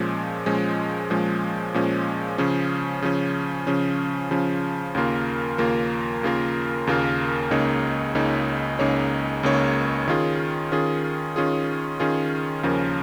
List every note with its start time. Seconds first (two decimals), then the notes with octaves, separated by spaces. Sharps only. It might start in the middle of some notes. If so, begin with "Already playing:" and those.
Already playing: A#2 F3 G#3 C#4
0.46 A#2 F3 G#3 C#4
1.10 A#2 F3 G#3 C#4
1.74 A#2 F3 G#3 C#4
2.38 C#3 F3 C#4
3.02 C#3 F3 C#4
3.67 C#3 F3 C#4
4.31 C#3 F3 C#4
4.95 D#2 C#3 A#3 F4 A#4
5.58 D#2 C#3 A#3 F4 A#4
6.23 D#2 C#3 A#3 F4 A#4
6.87 D#2 C#3 A#3 F4 A#4
7.51 C#2 C#3 A#3 D#4 C#5
8.15 C#2 C#3 A#3 D#4 C#5
8.79 C#2 C#3 A#3 D#4 C#5
9.43 C#2 C#3 A#3 D#4 C#5
10.07 D#3 C#4 F4 G#4
10.72 D#3 C#4 F4 G#4
11.36 D#3 C#4 F4 G#4
12.00 D#3 C#4 F4 G#4
12.63 D#2 C#3 F3 C#4 A#4